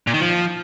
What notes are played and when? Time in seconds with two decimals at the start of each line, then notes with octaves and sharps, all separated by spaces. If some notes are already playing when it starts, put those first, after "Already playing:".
0.07 A#2
0.14 D#3
0.21 F3